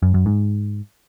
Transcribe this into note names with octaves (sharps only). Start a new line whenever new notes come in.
F#2
F#2
G#2